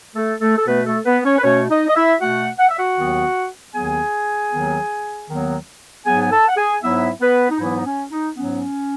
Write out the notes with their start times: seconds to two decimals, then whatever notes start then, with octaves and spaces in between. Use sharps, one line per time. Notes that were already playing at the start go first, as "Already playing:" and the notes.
0.15 A3 A4
0.41 A3 A4
0.57 A4
0.67 B2 A3 B3 B4
0.86 A3 A4
1.05 B3 B4
1.24 C#4 C#5
1.38 B4
1.44 B2 A3 C#4 C#5
1.70 D#4 D#5
1.88 D#5
1.95 E4 E5
2.21 B2 A3 F#4 F#5
2.59 F#5
2.69 E5
2.78 F#4 F#5
2.98 D#2 D#3 F#3 B3
3.75 D#2 D#3 F#3 B3 G#4 G#5
4.52 D#2 D#3 F#3 B3
5.29 D#2 D#3 F#3 B3
6.05 G#2 F#3 B3 G#4 G#5
6.21 G#5
6.31 A4 A5
6.48 F#5
6.57 G#4 G#5
6.83 G#2 F#3 B3 E4 E5
7.20 B3 B4
7.50 D#4
7.59 G#2 E3 F#3 B3 E4
7.75 D#4
7.85 C#4
8.11 D#4
8.36 G#2 F#3 B3 C#4